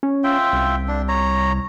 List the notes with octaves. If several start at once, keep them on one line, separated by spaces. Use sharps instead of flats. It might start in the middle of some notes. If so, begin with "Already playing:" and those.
C#4
F4 E5 G5
C2
D4
C#5 A#5